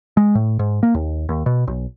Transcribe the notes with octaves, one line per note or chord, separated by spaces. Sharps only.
G#3
A2
G#2
A#3
D#2
D#2
B2
B1